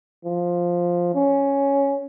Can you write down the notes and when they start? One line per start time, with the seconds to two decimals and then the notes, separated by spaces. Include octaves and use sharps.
0.25 F3
1.15 C#4